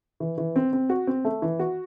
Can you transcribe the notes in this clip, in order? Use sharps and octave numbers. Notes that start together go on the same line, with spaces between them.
E3
E3
C4
C4
F#4
C4
A3
E3
F#4